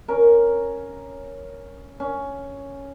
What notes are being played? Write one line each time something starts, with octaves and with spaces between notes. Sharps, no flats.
C#4 A#4
C#4